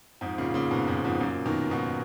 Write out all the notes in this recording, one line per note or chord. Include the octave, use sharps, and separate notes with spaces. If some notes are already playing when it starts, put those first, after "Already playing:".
F2 G#2
A#2 C#3
A#2 C#3
G#2 B2
F2 G#2
F2 G#2
F#2 A#2
B2 D#3
G#2 B2